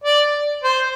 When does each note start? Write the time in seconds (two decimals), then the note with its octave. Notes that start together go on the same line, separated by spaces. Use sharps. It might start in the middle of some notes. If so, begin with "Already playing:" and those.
0.04 D5
0.64 C5